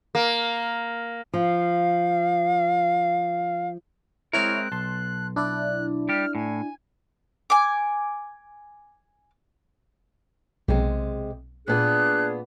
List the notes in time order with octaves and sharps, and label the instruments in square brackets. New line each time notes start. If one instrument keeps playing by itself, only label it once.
[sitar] A#3
[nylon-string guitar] F3 [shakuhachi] F5
[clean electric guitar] G#3 C4 A#4 [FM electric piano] E4 C#5 F6 [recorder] F#6
[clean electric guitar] B1 [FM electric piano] A5 C6
[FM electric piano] D4 E4 D5 [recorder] F#6
[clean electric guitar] G3 G4 [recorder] F6
[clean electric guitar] A2 [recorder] G#5
[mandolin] G#5 D6
[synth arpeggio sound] B1 [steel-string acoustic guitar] C3 G#3
[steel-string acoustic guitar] A#2 B3 [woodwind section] D4 G#4 [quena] F#6